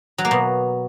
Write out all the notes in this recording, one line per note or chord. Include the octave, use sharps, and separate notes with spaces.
F#3
A#3
B2